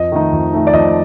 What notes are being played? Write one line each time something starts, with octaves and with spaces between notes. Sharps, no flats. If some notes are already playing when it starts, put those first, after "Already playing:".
Already playing: F2 D#5
D#3 A3 D#4
F2
D#3 A3 D#4
D5
F2 D#5